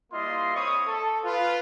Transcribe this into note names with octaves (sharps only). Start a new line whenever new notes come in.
G3 A#3 E4 F4 D#5 C6
C4 C#5 B5 C#6 D#6
A4
F4 B4